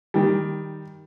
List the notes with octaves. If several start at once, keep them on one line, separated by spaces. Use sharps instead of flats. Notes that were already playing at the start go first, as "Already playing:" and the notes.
D#3 G3